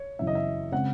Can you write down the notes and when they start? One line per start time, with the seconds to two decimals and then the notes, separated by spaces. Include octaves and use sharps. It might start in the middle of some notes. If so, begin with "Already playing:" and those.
Already playing: C#5
0.19 F#2 C#3 E3 E5
0.27 D#5
0.35 E5
0.72 C#3 G#3 C4 F#5